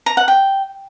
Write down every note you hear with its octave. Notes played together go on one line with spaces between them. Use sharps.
A#5
F#5
G5